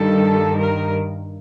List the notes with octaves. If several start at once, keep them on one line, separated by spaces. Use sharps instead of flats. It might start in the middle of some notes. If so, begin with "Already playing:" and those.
Already playing: G2 D#3 G3 A4
A#4